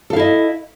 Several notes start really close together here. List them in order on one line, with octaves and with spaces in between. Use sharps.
A4 F5 E4 D#5